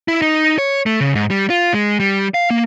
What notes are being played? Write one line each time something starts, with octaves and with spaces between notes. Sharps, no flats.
E4
D#4
C#5
A3
C#3
G#2
G3
F4
G#3
G3
F5
A#3